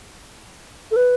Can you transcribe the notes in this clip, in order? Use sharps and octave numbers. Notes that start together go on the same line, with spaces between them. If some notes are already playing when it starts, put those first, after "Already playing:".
A4
B4